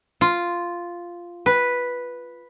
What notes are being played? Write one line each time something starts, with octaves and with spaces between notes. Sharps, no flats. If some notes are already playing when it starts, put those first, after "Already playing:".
F4
B4